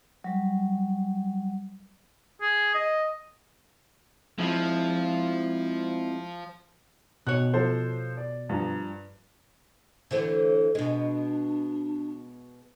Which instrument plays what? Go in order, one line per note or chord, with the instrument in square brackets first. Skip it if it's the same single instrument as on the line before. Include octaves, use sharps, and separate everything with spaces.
[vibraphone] F#3 G3
[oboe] G#4
D#5
[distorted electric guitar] F3 [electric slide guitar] G#3 C4 E4
[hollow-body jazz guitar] B2 C#5 [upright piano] F#6
[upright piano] F3 A4 C5
D5
G2 F3 A#5
[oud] D3 E3 A3 [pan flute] C5
[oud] B2 G#3 [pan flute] D4